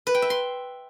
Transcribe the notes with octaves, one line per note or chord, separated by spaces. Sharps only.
B4
G5
E5
C6